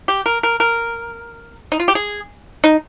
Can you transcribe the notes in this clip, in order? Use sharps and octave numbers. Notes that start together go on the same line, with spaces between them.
G4
A#4
A#4
A#4
D#4
F4
G4
G#4
D#4